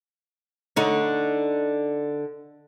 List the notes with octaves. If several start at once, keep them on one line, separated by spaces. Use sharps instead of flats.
D3 D#4 C#5